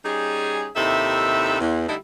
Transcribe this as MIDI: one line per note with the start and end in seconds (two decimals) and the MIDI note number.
0.05 0.68 55
0.05 0.68 61
0.05 0.68 63
0.05 0.68 68
0.76 1.58 39
0.76 1.58 48
0.76 1.58 63
0.76 1.58 64
0.76 1.58 69
0.76 1.58 76
1.60 1.86 40
1.88 1.97 50
1.88 1.97 55
1.88 1.97 57
1.88 1.97 63
1.88 1.97 64